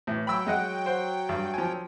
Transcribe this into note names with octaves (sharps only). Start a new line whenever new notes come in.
A2 E3
F#3 G5 B5 E6
G#3 D#5 F#5
C5 F#5
G2
F3 G#5